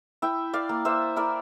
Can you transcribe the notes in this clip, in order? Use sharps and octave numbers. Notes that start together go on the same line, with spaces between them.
E4 E5 G5
D5 F5
A#3
C5 E5
E4 A#4 D5